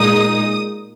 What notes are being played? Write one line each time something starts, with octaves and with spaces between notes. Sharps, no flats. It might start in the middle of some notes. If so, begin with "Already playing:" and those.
Already playing: A#2 G#3 D#4 D#6